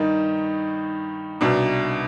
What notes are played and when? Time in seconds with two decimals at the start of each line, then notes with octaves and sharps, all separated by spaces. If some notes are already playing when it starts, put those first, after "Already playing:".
Already playing: G2 D#3 D#4
1.41 C2 B2 D4